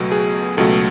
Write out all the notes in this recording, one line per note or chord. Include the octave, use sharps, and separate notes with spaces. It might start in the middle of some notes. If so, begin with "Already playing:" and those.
Already playing: C#2 B2 F#3 A3
G#4
C#2 B2 F#3 A3 A4